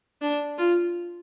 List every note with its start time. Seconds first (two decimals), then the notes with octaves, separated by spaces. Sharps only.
0.21 D4
0.58 F4